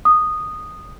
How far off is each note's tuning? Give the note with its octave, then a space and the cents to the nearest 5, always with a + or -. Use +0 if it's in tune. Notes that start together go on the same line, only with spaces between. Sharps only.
D#6 -10